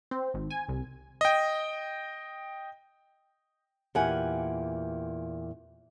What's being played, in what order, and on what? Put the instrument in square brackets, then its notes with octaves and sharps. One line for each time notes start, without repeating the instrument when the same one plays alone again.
[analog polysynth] C4
G#1
G#5
C2
[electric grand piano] D#5 G5
[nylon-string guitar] E2 A#2 G4 F#5 G#5